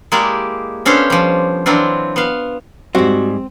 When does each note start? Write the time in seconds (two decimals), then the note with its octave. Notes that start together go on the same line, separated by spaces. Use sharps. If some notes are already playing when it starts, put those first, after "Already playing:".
0.12 G#3 A#3 E4 G4 G#4 D5
0.85 B3 C#4 D4 A4 C5 F5
1.10 F3 G3
1.66 E3 F#3 C4 D4 E4 F4
2.16 B3 F5
2.95 G#2 G3 C4 F#4